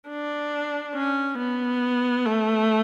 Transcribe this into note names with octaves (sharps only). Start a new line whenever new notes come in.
D4
C#4
B3
A3